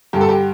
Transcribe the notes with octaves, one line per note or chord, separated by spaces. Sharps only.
G2 D3 G4
A4
G4